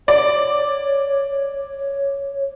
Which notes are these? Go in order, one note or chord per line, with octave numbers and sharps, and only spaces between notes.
C#5 D5